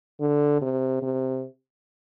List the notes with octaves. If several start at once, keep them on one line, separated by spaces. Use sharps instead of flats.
D3
C3
C3